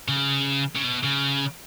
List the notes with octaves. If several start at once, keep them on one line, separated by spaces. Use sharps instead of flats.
C#3
C#3
B2
C#3